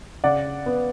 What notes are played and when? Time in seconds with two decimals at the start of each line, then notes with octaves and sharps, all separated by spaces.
0.24 C#3 D5 F#5
0.66 B3